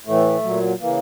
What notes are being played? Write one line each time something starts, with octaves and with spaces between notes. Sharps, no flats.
A2 E3 A3
A#2 F#3
C#3 E3 A#3